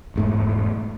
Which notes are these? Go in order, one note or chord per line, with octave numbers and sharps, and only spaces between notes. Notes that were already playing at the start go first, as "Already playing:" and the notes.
E1 G#2 A3